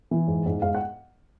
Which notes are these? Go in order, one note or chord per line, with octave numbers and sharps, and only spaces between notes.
E3
G#2
G#2
G#2 F5
F#5